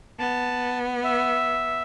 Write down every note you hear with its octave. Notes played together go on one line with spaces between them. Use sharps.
B3 A5
E5